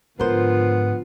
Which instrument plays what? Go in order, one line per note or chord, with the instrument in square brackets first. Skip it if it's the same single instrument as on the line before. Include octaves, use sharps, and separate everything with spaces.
[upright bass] G#2 [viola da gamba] D3 F3 F4 [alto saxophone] B3 [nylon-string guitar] A#4 C5